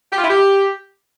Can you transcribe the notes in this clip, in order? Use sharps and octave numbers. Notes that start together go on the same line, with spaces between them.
G4
F4
E4
G4